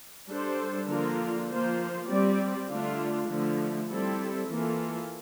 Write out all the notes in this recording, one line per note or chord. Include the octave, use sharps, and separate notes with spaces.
G3 D4 A4 C5
D3 F3 A#3 F4 A#4
F3 A#3 F4 C5
G3 C4 G4 D5
D3 A3 D4 F4
D3 F3 A3
G3 C4 E4 A4
E3 A#3 F4 A4